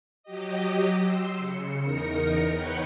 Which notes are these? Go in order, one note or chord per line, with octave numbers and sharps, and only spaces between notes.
F#3 G4 D#5
C6 E6
C#3 C#7
E2 D#4 A#4 A#6 C#7
B4 C#5 F#5 G5